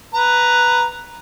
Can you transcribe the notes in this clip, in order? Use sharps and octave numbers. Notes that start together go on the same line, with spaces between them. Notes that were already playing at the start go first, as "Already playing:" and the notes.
B4 A#5